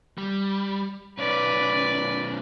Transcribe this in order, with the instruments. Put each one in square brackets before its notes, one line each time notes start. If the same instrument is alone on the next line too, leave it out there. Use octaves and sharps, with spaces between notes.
[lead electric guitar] G3
[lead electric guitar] B1 C#4 [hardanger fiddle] B4 D5